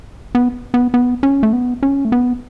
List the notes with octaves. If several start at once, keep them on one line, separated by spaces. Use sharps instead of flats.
B3
B3
B3
C#4
A3
B3
C#4
A3
B3